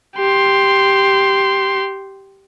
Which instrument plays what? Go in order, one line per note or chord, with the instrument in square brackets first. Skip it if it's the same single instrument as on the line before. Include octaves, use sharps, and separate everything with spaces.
[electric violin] G4 C6